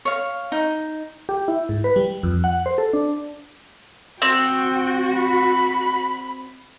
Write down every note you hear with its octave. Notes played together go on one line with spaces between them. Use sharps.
C#5 F5
D#4
G4
E4
G#2
B4
G3
F2
F#5
C5
A4
D4
C4 F#4 G5
B5